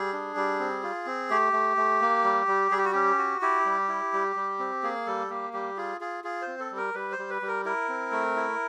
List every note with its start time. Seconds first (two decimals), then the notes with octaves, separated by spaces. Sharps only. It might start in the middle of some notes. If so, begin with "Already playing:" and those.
Already playing: G3 G#4
0.13 D4
0.36 G3
0.59 C4
0.83 F4
1.06 C4
1.30 A3 G4
1.53 A3
1.77 A3
2.01 A#3
2.24 G3
2.47 G3
2.71 G3 G#4
2.78 G4
2.85 F#4
2.92 C#4 G4
3.18 F#4
3.41 E4 G4
3.65 G3
3.88 E4
4.13 G3
4.36 G3
4.59 C4
4.83 A#3 G#4
5.06 G3 A4
5.30 A#3 G4
5.53 G3 G4
5.77 F4 G#4
6.01 F4 G#4
6.24 F4 G#4
6.42 C5
6.47 C4
6.59 A4
6.71 G3
6.77 A#4
6.94 G3 B4
7.12 C5
7.18 G3
7.30 B4
7.42 G3
7.48 A#4
7.65 E4 A#4
7.89 C4
8.12 A3
8.36 E4